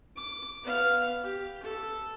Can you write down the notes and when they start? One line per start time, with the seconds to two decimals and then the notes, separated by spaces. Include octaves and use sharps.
0.16 D6
0.63 B3 F5
1.24 G4
1.63 A4